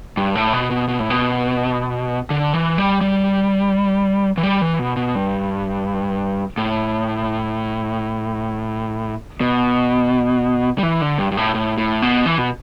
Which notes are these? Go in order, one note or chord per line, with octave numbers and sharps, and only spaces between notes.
G2
A2
B2
B2
B2
A2
B2
D3
E3
G3
G3
E3
G3
E3
B2
B2
G2
A2
B2
G3
E3
D3
G2
G2
A2
A2
A2
B2
E3
B2